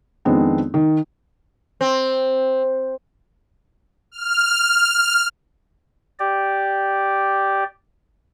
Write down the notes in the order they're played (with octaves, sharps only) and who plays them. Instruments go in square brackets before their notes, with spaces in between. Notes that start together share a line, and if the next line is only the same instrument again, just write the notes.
[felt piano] F2 D#3 G#3 B3 C4 D4
D#3
[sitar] C4
[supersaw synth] F6
[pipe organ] G4 D5